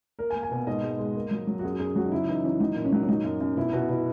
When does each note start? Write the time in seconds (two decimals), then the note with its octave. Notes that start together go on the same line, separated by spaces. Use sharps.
0.19 A#3 A#4
0.30 G#5
0.35 A#3
0.43 G#5
0.51 B2
0.67 G#2 D#5
0.83 G#3
0.99 G#3
1.15 A#3
1.31 F#3
1.47 F#3
1.59 F#4
1.63 F#2 G#4
1.79 F#2 G#4
1.95 F#3 F#4
2.06 D#4
2.12 C#3 E4
2.27 E3 D#4
2.44 E3 C#4
2.60 F#3 D#4
2.76 A#2
2.85 C#4
2.92 F#3
3.03 C#4
3.08 F#3 D#4
3.24 F#2
3.41 F#2
3.57 B2 E4
3.73 B2 F#4
3.89 B2 E4